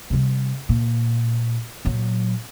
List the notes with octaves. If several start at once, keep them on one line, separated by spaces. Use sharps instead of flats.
C3 G3
A#2
A#2 F#3